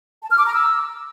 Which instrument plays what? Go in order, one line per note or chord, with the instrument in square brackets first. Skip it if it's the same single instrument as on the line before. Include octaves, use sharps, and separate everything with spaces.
[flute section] A5
F6
D6
A#5
E6